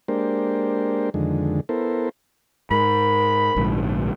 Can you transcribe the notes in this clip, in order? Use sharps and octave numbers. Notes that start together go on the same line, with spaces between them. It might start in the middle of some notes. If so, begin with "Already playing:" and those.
G#3 A#3 D4 G4 A#4 C5
F2 D3 D#3 G#3
B3 E4 A4 A#4 C5
G#2 A#4 B5
A#1 G#2 D3